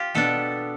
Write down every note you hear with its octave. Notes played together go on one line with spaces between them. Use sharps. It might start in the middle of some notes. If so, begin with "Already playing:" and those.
Already playing: F4 G4
B2 B3 D4 A4